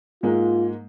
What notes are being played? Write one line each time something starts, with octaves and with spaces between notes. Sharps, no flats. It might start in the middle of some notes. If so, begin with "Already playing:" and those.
G#2 G#3 A#3 F4